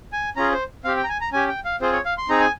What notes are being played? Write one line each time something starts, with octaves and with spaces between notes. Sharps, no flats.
G#5
C#4 F4 G#4 A#5
C5
C4 G4 F5
G5
A#5
G#5
A#5
C#4 G4 G#5
G5
F5
C4 F4 G#4 C5
C#5
F5
C6
C4 D#4 G#4 A#5
G#5